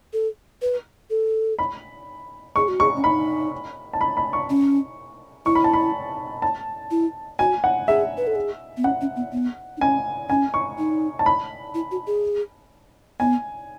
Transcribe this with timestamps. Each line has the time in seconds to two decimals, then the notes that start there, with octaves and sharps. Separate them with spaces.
0.13 A4
0.62 B4
1.10 A4
1.59 B5
2.56 G#4 C#6
2.68 F#4
2.80 G#4 C#6
2.96 C#4
3.04 D#4 B5
3.93 A5
4.01 B5
4.17 B5
4.33 C#6
4.50 C#4
5.45 E4 C#6
5.55 B5
5.64 A5
5.73 B5
6.42 A5
6.91 E4
7.39 F#4 G#5
7.64 F#5
7.88 G#4 E5
8.17 B4
8.27 A4
8.35 G#4
8.77 B3
8.84 C#4 F#5
9.01 C#4
9.16 B3
9.32 B3
9.77 D#4
9.81 C#4 G#5
10.29 C#4 G#5
10.54 C#6
10.78 D#4
11.19 A5
11.26 B5
11.74 E4
11.91 F#4
12.07 G#4
13.20 B3 G#5